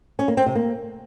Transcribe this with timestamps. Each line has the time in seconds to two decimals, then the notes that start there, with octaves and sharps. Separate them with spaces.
0.19 C#4
0.28 A#3
0.37 C4
0.46 C3
0.55 A#3